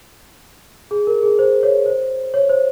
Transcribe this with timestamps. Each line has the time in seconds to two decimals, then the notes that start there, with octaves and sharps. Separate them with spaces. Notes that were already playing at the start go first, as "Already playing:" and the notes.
0.91 G#4
1.07 A#4
1.23 G#4
1.39 C5
1.63 C#5
1.86 C5
2.34 C#5
2.49 C5